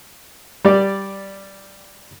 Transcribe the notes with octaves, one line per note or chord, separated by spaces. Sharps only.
G3 D5